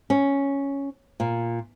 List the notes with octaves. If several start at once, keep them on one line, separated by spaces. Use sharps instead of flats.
C#4
A#2